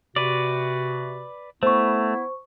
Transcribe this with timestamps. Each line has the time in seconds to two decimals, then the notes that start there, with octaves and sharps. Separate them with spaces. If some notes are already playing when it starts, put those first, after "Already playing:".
0.16 C3 F#4 B4 D5
1.63 A3 B3 E4 C5 C#6